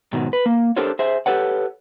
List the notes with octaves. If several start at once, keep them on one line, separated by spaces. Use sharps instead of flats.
G#2 B2 D#3 F#3
B4
A#3
D4 G4 A4 A#4 C5 C#5
G#4 C5 E5
G4 A4 B4 C#5 F#5